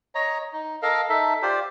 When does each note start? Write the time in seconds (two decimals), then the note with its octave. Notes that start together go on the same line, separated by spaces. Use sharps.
0.15 C#5 D#5 A#5
0.53 D#4
0.82 A4 A#4 D#5 F5
1.09 D#4 A4 E5
1.42 F4 G4 C5 D5